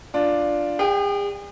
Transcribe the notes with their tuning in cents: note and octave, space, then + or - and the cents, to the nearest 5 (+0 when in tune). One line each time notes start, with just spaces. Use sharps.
D4 +0 F4 +0
G#4 -45 G5 -15